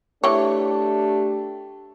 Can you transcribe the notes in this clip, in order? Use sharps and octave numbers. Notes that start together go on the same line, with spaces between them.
E3 A3 D4 G4 C#5